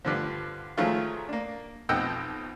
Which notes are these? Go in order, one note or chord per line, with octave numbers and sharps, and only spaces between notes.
G2 D3 F3
D#3 F3 F#3 G#3 A3 F4
A#3 D4
B1 F2 D#5 F#5 G5 E6